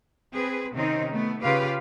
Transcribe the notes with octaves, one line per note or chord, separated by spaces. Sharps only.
C4 G#4 B4
C3 D#3 C4 C#4 D#4
A3 B3
C#3 F4 G4 B4 F5